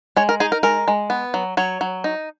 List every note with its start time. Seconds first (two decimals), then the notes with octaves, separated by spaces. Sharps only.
0.16 G#3 C#5
0.29 A#4
0.40 D#4 G#4
0.52 A#4
0.63 G#3 A#4
0.88 G#3
1.10 B3
1.34 F#3
1.57 F#3 C#5
1.81 F#3
2.04 D#4